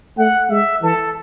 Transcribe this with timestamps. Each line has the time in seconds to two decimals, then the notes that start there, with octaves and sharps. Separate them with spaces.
0.18 A3 F#5
0.50 G#3 E5
0.83 E3 A4